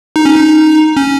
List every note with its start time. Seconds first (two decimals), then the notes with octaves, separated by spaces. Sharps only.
0.16 D#4
0.25 C#4
0.36 D#4
0.97 C#4